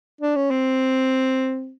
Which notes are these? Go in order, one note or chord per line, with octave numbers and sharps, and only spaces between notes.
D4
C#4
C4